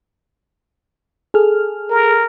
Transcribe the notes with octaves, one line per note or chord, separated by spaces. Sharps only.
G#4 A4 F6
A#4